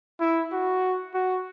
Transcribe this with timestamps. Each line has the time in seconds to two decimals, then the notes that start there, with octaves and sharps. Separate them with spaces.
0.20 E4
0.52 F#4
1.15 F#4